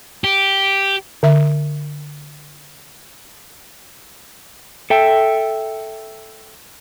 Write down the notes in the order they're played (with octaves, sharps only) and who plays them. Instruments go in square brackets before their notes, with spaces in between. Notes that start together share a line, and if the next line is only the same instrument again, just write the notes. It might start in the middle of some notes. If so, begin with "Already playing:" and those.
[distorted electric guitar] G4
[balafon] D3 E5
[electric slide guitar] A4 E5 G5